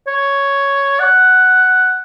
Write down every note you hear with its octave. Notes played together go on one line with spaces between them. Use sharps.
C#5
F#5